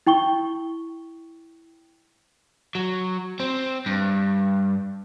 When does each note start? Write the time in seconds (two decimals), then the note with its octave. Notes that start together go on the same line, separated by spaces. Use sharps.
0.07 E4 G5 C#6 G7
2.75 F#3
3.40 C4
3.86 G2